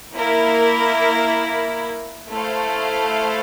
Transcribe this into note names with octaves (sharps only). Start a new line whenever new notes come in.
A#3 E4 A#4
A3 E4 A4 C5 F5